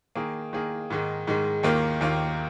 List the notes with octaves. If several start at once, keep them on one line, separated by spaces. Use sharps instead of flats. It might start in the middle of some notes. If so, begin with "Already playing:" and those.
D#3 A#3 G#4
D#3 A#3 G#4
G#2 D#3 G#3
G#2 D#3 G#3
D#2 D#3 A#3 F4
D#2 D#3 A#3 F4